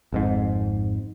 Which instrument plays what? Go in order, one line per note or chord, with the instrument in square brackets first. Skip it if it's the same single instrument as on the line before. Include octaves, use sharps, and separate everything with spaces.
[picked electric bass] G#1 F2 G#2